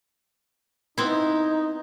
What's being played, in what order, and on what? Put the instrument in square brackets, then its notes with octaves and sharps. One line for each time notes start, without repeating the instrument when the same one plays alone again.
[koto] B3 C4 E4 [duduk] D#4